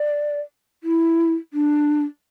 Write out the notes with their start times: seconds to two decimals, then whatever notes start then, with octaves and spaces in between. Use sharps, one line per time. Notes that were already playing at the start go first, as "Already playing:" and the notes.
Already playing: D5
0.83 E4
1.53 D4